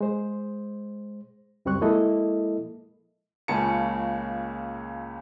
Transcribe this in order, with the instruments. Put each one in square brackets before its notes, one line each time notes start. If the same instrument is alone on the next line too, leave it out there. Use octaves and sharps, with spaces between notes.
[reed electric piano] G#3 C5
C#2 F#2 G3 C4 C#6 F#6
F3 G#3 A#3 E4 A4 D#5
[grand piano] C#2 A#2 C#3 C#4 A5 C#7